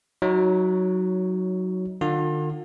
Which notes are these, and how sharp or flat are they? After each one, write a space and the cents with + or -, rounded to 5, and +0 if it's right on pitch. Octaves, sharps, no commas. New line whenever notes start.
F#3 +0 D#4 +25 C#5 +10
D3 +45 F4 +35